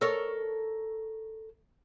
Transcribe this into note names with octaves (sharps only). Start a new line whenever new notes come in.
A4 A#4 C#5